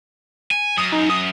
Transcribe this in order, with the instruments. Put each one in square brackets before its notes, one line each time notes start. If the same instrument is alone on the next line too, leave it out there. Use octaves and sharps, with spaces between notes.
[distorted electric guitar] G#5
[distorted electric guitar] F#2 [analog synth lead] D#6
[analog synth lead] D#4
D#6